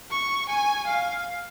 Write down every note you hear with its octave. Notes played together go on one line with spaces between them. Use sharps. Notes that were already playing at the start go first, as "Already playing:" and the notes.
C#6
G#5
F5